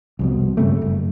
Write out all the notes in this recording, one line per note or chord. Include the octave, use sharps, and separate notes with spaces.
C2 F2 B2
G2 C#3 A3
F#1